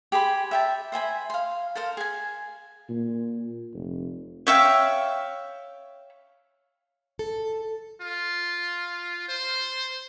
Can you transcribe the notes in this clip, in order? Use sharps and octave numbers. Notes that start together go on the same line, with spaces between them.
G4 G#4 C5 B5
E5 G5 A5
C5 E5 G#5 B5
F5 C6
A4 A#4 C5 F5
G#4 G#5
A#2
F1
C#5 E5 F5 G5
A4
F4
C5